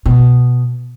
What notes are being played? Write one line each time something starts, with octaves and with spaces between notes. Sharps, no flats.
B2